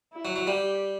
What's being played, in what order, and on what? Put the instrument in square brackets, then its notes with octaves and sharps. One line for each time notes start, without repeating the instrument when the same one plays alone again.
[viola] E4
[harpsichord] F#3
F#3
[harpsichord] G3 [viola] G4